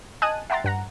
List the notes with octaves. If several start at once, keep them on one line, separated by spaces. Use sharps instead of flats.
D#5 G#5 A5 D#6 F#6 D#7
E5 F#5 G5 A#5 C6 A6
G2 F#5 A#5